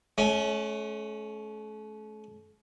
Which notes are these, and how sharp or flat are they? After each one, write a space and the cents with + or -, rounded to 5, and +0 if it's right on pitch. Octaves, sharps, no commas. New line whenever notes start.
A3 -40 C#4 +0